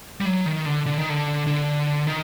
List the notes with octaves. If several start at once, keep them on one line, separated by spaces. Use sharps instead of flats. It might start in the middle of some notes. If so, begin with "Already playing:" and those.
G3
F#3
D#3
D3
D3
D#3
D3
D3
D#3